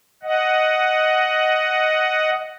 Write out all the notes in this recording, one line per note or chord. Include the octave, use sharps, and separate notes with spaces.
D#5 F#5